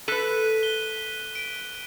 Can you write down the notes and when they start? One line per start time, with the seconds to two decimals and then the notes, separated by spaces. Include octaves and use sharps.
0.08 A4 B4 F#6 B6 D#7
0.63 G7
1.35 D7